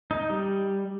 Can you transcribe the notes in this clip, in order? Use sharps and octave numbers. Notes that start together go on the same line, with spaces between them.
D#4
G3